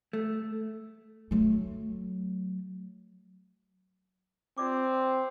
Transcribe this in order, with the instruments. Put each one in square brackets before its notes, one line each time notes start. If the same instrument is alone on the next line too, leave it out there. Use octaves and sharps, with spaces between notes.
[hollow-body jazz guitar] A3
[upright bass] F#3 A3
[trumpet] C4 [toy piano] F4 D5 D6